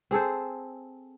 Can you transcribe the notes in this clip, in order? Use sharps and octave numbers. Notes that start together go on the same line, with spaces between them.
C4 G#4 A4 C5